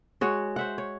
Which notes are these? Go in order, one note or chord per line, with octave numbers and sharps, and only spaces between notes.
G#3 F#4 C#5
C5 E5 F#5
C#5